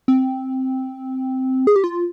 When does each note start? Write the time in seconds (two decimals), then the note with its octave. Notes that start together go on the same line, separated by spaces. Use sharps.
0.08 C4
1.67 G#4
1.76 G4
1.84 F4